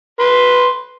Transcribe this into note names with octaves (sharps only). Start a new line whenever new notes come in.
B4 C6